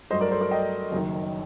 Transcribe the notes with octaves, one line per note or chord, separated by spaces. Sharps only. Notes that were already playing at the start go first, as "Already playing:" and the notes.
G2 F#3 A3 C5 D#5
A#4 D5
A4 C5
A#4 D5
D#5 G5
F#1 F#2 D#3